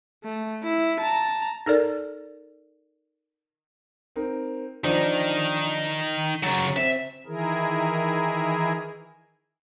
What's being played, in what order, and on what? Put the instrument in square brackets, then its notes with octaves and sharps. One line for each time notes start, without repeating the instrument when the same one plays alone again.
[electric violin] A3
E4
A5 A#5
[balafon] D#4 A4 A#4 D5
[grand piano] C4 D#4 A#4
[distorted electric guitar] D#3 D#4 [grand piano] F3 D4
[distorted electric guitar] C#3 F#3 [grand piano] A#5 A6
[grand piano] C4 [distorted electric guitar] E5
[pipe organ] D#3 E3 E4 G#4 A#4